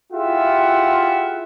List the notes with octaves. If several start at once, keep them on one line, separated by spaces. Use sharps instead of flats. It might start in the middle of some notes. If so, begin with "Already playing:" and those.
E4 F4 G4 G#4 E5 F#5